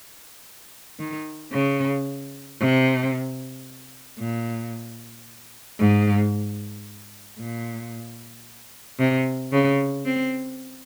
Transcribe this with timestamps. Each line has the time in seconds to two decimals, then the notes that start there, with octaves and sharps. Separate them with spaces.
0.99 D#3
1.53 C#3
2.60 C3
4.19 A#2
5.79 G#2
7.39 A#2
8.99 C3
9.52 C#3
10.05 C4